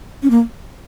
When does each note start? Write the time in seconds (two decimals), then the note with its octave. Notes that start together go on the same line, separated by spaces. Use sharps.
0.23 C#4
0.30 A#3